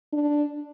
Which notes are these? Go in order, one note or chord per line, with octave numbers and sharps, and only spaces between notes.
D4